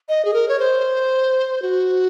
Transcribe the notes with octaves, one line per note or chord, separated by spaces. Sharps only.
D#5
G#4
A#4
C#5
C5
F#4